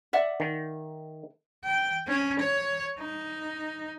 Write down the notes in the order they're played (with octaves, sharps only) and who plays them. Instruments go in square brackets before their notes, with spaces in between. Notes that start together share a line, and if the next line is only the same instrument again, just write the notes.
[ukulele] D5 E5 F#5
[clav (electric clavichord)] D#3
[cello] G5
C#4
C#5
D#4